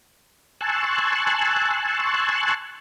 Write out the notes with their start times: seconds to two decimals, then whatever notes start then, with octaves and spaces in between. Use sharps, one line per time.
0.61 G#5 A5 C6 C#6 E6 F#6